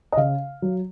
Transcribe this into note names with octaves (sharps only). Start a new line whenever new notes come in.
D#5
C#3 F5
F#3